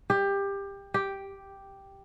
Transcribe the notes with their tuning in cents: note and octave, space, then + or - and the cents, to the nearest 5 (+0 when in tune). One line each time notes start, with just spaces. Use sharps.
G4 +20
G4 +0